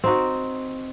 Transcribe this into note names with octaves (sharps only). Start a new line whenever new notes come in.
C4 D#4 F#4